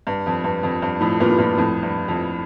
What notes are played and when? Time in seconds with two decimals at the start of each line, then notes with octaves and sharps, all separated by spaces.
0.07 G2
0.26 F2
0.44 G2
0.63 F2
0.82 G2
1.01 F2 A2
1.20 G2 A#2
1.30 A2
1.38 G2 A#2
1.58 F2 A2
1.83 G2
2.08 F2